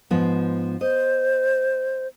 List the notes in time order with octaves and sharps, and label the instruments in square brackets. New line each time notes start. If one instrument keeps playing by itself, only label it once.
[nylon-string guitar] G#2 F3 B3
[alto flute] C5 [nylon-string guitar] D#5